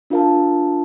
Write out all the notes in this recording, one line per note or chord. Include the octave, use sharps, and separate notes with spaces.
D4 F4 A#4 F5 A5